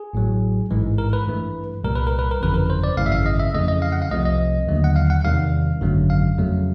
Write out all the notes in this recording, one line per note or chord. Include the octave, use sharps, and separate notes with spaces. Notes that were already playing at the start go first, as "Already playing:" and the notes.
Already playing: G#4
A1 A2 F#3
A1 G#2 E3 G#3
A#4
B4
G2 E3 A3
C2 A#2 G3 A#4
B4
A#4
B4
A#4
G1 F2 C#3 E3 B4
A#4
C5
D5
G#1 F#2 C#3 E3 A3 F5
E5
F5
D#5
E5
F2 C#3 E3 A3 D#5
D#5
F5
F#5
F5
C2 C3 F3 A3 D#5
D#5
D#2 D3 F#3 A3
F#5
F5
F#5
E2 C3 D#3 G3 F5
G#1 F#2 D3 F#3 A3
F5
F2 C#3 F#3 A3